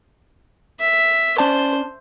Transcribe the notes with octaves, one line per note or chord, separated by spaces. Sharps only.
E5
C#4 C5 D5 A5